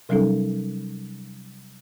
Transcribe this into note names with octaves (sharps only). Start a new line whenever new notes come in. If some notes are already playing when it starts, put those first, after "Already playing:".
C3 F#3 G3 C#4 D#4 A4